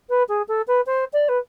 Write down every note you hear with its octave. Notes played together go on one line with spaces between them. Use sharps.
B4
G#4
A4
B4
C5
D5
B4